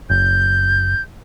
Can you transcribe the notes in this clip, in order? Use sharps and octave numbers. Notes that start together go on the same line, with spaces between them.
F#1 G6